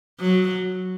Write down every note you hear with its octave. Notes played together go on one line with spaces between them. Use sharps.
F#3